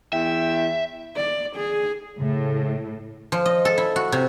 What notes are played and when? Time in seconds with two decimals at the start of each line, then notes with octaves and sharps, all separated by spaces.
0.13 E2 E5 G5
1.16 D5
1.56 G#4
2.19 A2 C#3
3.32 F3
3.46 D#5
3.65 A4
3.78 E4
3.96 F#4
4.12 C3